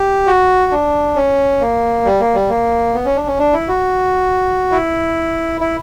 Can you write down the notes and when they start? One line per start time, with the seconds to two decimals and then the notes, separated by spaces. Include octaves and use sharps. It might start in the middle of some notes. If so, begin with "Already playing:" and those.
Already playing: G4
0.27 F#4
0.72 D4
1.16 C#4
1.61 A#3
2.05 G3
2.20 A#3
2.35 G3
2.49 A#3
2.94 B3
3.05 C#4
3.16 D4
3.27 C#4
3.39 D4
3.53 E4
3.68 F#4
4.72 E4
5.61 E4